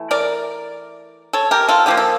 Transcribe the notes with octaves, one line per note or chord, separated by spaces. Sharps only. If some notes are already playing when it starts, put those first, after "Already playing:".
Already playing: E3 A3
A#4 D5
A4 C#5
G4 A#4
F4 A4
D3 F3 A#3 G4
A4